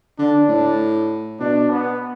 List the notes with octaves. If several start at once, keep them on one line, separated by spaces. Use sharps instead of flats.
D3 D4
A2
B2 D4
B3